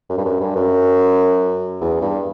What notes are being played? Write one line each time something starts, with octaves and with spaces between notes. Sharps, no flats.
F#2
G2
F#2
G2
F#2
E2
G2